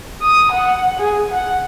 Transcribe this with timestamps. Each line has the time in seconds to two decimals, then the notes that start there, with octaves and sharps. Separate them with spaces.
0.22 D#6
0.52 F#5
0.99 G#4
1.31 F#5